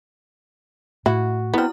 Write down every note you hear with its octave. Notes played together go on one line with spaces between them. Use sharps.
A2 E4 F#4
B3 C4 E4 F6